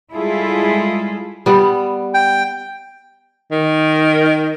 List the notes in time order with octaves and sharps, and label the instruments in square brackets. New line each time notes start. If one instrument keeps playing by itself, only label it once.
[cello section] G3 G#3 E4 F4 G#4 A4
[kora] G3 B3
[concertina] G5
[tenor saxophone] D#3